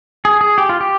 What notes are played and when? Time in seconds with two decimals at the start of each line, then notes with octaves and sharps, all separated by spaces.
0.25 G#4
0.41 G#4
0.58 G4
0.69 F4
0.81 G4